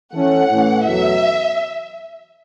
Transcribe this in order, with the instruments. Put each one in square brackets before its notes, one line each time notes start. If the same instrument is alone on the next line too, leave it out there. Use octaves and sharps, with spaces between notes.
[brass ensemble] E3 A3 C#4 A4 [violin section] F#5
[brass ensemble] A2 E3 A3 C#4
[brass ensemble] E2 B2 F#3 A3 [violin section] E5